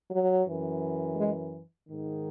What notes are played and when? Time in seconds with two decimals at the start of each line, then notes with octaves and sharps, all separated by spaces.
0.11 F#3
0.46 F#2 E3
1.16 G#3
1.87 G#2 D#3